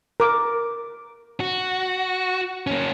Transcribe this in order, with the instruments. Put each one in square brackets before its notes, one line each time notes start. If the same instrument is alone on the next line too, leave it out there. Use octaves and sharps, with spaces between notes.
[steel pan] A#4 D6
[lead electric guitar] F#4
A#3 C#4